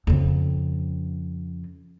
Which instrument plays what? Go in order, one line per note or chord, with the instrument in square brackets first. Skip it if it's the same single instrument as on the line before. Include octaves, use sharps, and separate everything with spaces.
[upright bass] F2 C#3